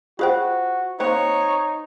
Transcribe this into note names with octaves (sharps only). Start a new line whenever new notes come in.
F4 F#4 G#4 C5 F5 G5
A#3 C4 D#4 C5 C#5 F5